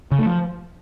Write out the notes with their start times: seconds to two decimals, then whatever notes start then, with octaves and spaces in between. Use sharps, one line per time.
0.11 C#3
0.19 A3
0.26 F3